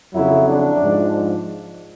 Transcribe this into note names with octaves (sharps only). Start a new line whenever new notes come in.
F2 C#3 F#3 E4
D4
G#2 F3